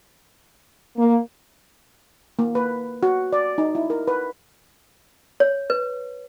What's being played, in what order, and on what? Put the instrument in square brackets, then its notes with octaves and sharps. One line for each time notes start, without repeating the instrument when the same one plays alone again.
[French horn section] A#3
[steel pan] A#3
B4
F#4
D5
D#4
E4
A#4
B4
[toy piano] C#5
B4